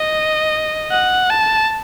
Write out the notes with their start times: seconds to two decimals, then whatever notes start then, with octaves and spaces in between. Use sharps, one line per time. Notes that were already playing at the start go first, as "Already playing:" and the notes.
Already playing: D#5
0.91 F#5
1.30 A5